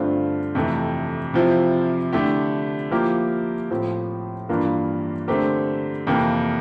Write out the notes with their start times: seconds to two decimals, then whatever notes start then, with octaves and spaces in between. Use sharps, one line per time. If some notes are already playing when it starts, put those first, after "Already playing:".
Already playing: G2 D3 A3 C4 F4
0.55 F2 C3 E3 A3
1.34 C3 F3 C4 E4
2.13 D3 A3 E4 G4
2.91 F3 A#3 E4 G4 A#4
3.71 A2 F3 C4
4.49 G2 E3 A#3 F4 A#4
5.28 D3 A3 C4 G4 A#4
6.07 F2 C3 E3 A#3